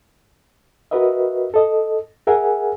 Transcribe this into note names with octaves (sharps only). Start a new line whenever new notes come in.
F#4 A#4 B4 D#5 E5
A4 D#5
G#4 A#4 E5 F#5 G#5